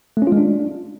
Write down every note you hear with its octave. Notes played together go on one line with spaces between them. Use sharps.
A3
C#4
F4
G#3
D4